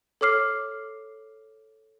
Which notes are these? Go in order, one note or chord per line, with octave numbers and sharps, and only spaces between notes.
A4 C#5 D6 F6 C7